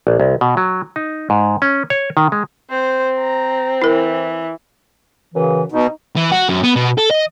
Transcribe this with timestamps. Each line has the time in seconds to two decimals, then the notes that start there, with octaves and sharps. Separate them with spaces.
0.07 A#1
0.20 C2
0.41 B2
0.57 F#3
0.96 D#4
1.30 G#2
1.62 C#4
1.90 C#5
2.17 D#3
2.32 G#3
2.71 C4 C5
3.19 A#5
3.82 E3 E4 A#4
5.34 F#2 C#3 E3
5.72 B2 D#4
6.16 E3
6.32 F#4
6.50 F#2
6.64 B3
6.76 B2
6.98 A4
7.11 D#5